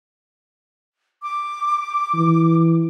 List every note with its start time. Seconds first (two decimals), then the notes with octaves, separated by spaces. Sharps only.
1.23 D6
2.14 E3